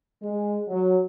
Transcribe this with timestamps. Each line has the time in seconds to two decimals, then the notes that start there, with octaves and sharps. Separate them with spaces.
0.22 G#3
0.68 F#3